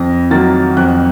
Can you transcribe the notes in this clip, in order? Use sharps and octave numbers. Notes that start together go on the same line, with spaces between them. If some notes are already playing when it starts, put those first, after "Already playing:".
Already playing: F2 A#6
D#3 F#3 A#3 A6
F2 F#6